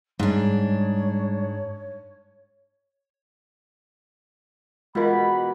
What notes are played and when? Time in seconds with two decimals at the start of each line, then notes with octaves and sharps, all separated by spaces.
0.19 G#2 G3 G#3 D4 C#5
4.95 B2 E3 G#3 F4 A#4 B5